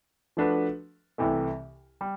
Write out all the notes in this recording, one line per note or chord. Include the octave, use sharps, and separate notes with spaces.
F3 A3 D4 F#4 B4
C2 C3 E3 A3
G3